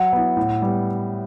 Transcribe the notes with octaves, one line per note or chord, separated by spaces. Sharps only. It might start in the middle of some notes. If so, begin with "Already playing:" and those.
Already playing: F#3 E5 F#5
B3 E4
A2
G3 B3